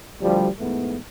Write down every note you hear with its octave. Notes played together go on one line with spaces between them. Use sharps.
D2 F3 G3
E2 G#2 A3 B3